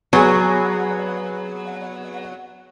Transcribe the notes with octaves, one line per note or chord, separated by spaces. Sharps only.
F#3 B3 G#4